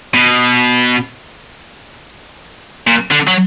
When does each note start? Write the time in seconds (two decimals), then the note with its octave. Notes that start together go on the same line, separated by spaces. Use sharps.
0.14 B2
2.87 A#2
3.11 D3
3.28 F#3